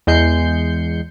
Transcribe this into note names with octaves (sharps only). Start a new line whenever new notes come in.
E2 G#3 G6 C7 C#7